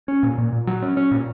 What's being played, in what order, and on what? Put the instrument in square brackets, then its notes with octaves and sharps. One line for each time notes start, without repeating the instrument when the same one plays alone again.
[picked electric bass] C#4
A#2
A#2
A#2
F#3
C#4
C#4
A#2